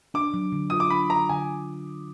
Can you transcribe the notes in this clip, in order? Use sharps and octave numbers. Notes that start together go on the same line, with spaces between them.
D4 D6
F#3
D3
F4 D#6
D6
D4 B5
F#3 A#5
D3 G#5